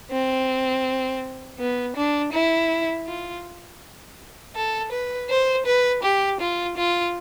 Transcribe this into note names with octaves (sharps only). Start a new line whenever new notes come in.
C4
B3
D4
E4
F4
A4
B4
C5
B4
G4
F4
F4